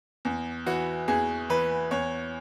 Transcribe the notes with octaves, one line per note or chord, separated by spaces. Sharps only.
E2
E3 F#4
E2 G#4
E3 B4
E2 C#5